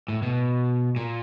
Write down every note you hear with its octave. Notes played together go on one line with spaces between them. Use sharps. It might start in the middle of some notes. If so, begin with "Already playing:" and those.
A2
B2
A#2